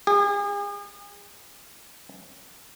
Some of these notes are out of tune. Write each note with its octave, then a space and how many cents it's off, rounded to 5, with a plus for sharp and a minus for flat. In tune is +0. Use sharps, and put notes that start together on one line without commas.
G#4 -40